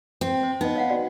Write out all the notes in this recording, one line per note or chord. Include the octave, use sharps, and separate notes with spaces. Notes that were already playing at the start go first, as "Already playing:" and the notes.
C4
C5
B3 D#4 D#5
C#5 F5 F#5
F#4 D5